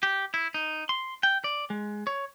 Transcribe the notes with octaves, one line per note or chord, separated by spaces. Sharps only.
G4
E4
D#4
C6
G5
D5
G#3
C#5